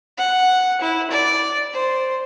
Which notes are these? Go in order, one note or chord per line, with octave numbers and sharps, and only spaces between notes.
F#5
E4
D5
C5